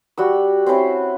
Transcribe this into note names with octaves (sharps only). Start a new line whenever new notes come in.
G3 F#4 E6
C4 C#4 E4 C5